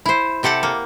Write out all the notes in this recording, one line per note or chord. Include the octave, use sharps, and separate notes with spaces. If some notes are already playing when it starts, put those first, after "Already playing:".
E4 C5
C3 G4 A4 F#5 A5
A#3